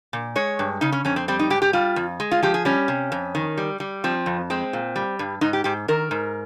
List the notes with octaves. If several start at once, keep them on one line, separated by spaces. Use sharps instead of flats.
A#2
G#3 C#5
G2
C#3 D#4
C#4
F2 C#4
C4
G3 C4
D#4
G#2 G4
G4
G3 F4
F2
G#3
F4
F3 G4
G#4
G3 C#4
C3
F2
D#3
G3
G3
F3 C4
F2
G#3 C4
A#2
G3
G2
G#2 D#4
G4
G#2 G4
D#3 A#4
G#2